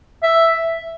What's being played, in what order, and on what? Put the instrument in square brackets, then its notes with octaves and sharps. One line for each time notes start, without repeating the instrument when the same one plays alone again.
[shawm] E5